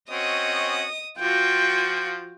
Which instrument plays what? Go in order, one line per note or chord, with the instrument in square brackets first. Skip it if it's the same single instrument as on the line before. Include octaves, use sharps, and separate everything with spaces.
[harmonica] C4 C#4 F#4 [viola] D#5 [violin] D#6
[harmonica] F3 [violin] F4 F#4 [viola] G5